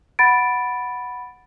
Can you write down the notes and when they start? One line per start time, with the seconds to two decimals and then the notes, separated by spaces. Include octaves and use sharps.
0.19 F#5 B5 A6 D7